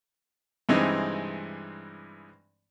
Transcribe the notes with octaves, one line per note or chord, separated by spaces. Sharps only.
G2 C3 E3 G#3 C4 D#4